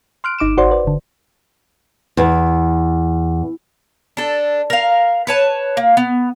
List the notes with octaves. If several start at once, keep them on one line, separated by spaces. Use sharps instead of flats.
C6 F6 F#6 D7
G1 D#4 D6 D7 E7
G#1 F#4 C5 D5 F#5 C6
B4 D5
G1 D3
E2
D4 A4
A#4 F5
B4 C#5 A5
A#3
B3